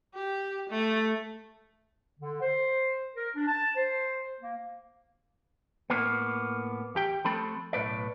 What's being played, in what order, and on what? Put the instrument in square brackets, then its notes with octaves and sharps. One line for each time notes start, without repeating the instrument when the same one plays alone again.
[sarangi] G4
A3
[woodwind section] D3
C5
A#4
D4
A5
C5
A#3
[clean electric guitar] A2 A#3 B3
E2 G4 G5
F3 A3 C4 A4 B5
B1 A2 B4 D5